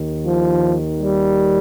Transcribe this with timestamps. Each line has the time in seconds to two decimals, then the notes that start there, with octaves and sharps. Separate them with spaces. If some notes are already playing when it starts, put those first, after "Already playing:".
Already playing: D#2 D#3
0.25 F3
1.00 G3